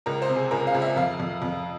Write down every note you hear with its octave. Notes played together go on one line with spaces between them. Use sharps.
C#2 A#4
C5
C3
G#4
C#2 A#4
F5
C#2
E5
F2 F5
F2
F2